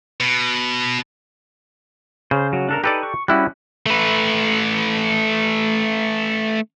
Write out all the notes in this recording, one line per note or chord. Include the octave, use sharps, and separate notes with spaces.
B2
C#3 C5
F#3
D4 A4 A#4
D#4 G4 A4 B4 D5
C#6
G3 C#4 E4 F#4 F#6
A3 B4